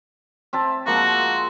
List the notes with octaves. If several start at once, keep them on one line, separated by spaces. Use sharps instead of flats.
C4 E5 A5
F3 G#3 A#3 F#4